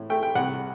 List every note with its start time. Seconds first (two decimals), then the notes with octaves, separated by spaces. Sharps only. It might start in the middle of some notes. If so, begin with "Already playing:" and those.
Already playing: A2
0.10 A3 G5
0.23 G5
0.35 C2 F#5